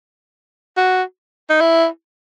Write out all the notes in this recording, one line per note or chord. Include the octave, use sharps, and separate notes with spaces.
F#4
D#4
E4